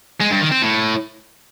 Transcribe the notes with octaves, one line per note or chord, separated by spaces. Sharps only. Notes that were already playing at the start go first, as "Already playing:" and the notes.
G#3
G2
D#3
C4
A2